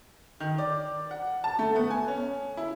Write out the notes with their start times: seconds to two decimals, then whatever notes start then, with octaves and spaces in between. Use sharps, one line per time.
0.40 D#3
0.58 D5
1.11 F#5
1.44 A5
1.59 A3
1.76 B3
1.90 G#5
2.08 C#4
2.57 E4